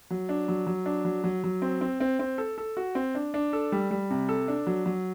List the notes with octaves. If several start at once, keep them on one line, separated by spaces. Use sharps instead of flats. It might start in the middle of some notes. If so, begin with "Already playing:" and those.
F#3
D4
F#3
F#3
D4
F#3
F#3
F#3
C4
C4
C4
C4
A4
A4
F#4
C4
D4
D4
A4
G3
G3
C3
A4
D4
F#3
F#3